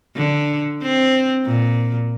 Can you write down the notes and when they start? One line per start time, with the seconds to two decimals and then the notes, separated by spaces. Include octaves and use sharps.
0.16 D3
0.82 C4
1.45 A#2